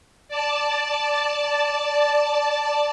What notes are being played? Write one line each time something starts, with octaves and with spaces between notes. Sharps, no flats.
D5 A5